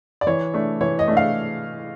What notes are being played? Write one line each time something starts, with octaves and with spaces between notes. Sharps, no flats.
D5
E3 C#5
A3 D4
E3 C#5
D#5
A3 D4
F5